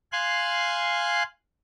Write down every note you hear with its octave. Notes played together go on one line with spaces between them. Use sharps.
F5 G#5 C6 F#6